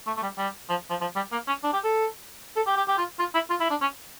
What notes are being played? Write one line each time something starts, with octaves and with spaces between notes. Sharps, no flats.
A3
A3
G3
G3
F3
F3
F3
G3
A#3
C#4
D4
G4
A4
A4
G4
G4
G4
F4
F4
E4
F4
E4
D4
C#4